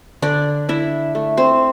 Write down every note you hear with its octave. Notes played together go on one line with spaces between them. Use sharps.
D3 D4 D5
D4 E4 E5
A3
C4 C5